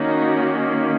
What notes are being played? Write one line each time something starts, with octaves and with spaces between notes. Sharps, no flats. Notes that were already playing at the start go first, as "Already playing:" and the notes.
Already playing: D#3 A#3 C#4 D#4 F#4